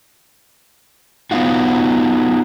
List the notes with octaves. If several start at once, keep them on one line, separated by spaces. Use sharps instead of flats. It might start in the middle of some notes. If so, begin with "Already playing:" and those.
B3 D#4 F4 F#4